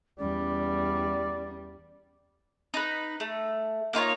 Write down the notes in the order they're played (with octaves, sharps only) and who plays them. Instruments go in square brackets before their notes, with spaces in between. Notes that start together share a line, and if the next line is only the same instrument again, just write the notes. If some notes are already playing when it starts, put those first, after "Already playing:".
[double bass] E2 G3 [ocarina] C#4 [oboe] D5
[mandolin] D#4 B4
A3
A#3 D#4 F4 C#5